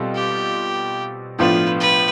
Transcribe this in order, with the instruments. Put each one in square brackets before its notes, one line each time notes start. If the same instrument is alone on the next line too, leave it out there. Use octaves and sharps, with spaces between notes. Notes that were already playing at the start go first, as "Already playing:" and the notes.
Already playing: [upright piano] B2 G3 C4 F4 A4
[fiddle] G4
[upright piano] A2 F3 B3 D4 F4 [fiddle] B4
[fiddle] B4